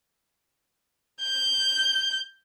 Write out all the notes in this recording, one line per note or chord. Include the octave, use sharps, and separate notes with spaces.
G6